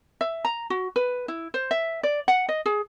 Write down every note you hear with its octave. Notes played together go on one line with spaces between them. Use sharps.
E5
A#5
F#4
B4
E4
C5
E5
D5
F#5
D#5
G#4